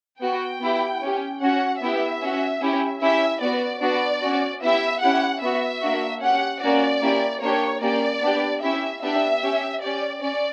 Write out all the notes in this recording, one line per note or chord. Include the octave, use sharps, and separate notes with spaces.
B3 F#4 G5
B3 E4 G4
C#4 G4
C#4 F#4 F#5
B3 E4 G4 E5
C#4 F#4
C#4 E4 G4
C#4 E4 G4 E5
B3 F#4 D5
B3 D4 F#4 D5
C#4 F#4
B3 E4 G4 E5
C#4 E4 G4 F#5
B3 F#4 E5
A#3 D4 F#4
C#4 G4 F#5
A#3 C#4 F#4 D5
A#3 C#4 E4 G4
A#3 D4 G4 C#5
A#3 C#4 G4 D5
B3 D4 G4
C#4 E4 G4 E5
B3 D4 G4 E5
C#4 G4
C#4 G4 D5
C#4 D5